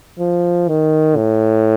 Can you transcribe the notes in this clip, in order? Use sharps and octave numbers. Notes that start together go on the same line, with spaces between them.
F3
D#3
A2